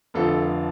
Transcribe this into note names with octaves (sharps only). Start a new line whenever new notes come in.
F1 F2 D3 F3 A4